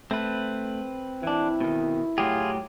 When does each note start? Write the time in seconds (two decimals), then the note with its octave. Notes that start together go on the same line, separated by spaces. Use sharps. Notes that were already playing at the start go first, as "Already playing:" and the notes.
0.11 A3 C4 B4
1.23 E3 D4 E4
1.61 B2 D#3
2.18 A2 F#3 F4 G4 G#4